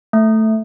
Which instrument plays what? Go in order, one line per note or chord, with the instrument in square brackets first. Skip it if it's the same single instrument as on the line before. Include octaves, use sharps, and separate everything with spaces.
[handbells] A3